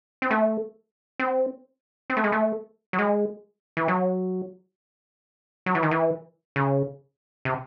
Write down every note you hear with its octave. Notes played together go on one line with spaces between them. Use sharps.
C4
A3
C4
C4
A3
G#3
A3
F#3
G#3
E3
F#3
F#3
E3
D#3
E3
C#3
C3